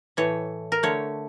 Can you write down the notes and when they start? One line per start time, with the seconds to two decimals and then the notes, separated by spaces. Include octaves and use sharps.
0.17 A2 E3 A3 C#5
0.72 A#4
0.83 D3 A3 C#5